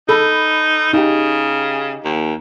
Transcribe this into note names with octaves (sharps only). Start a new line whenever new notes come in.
D#4 A4 B5
C#3 D#4 G4
D#2